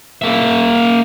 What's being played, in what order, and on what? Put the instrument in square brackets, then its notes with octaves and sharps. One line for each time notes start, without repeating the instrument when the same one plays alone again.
[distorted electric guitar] A#3 E5